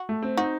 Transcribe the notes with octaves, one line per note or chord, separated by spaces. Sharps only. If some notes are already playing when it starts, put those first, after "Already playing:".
Already playing: F#4
A3
C4
D#4 F#4